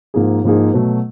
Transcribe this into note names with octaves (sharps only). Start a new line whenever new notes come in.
G#2 F3 A#3 D#4 G#4
G#2 F3 A#3 D#4 G#4
B2 F#3 A3